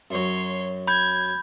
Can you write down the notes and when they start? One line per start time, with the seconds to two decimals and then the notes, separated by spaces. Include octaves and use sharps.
0.11 F#2 F#3 C#5 C6
0.87 B5 G6 G#6